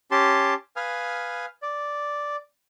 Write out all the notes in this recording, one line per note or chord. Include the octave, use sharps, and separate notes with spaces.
C#4 G4 A5 C6
B4 F5 G#5 D#6 F6
D5